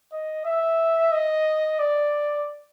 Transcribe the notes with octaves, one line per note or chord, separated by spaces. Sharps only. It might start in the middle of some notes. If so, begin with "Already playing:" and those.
D#5
E5
D#5
D5